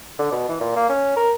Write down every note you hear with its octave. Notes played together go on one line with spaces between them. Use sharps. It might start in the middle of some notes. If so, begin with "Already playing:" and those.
D3
B2
E3
A#2
A#3
C#4
A#4